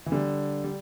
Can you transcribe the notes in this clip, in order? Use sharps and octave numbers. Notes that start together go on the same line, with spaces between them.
E3
D3 G3
G3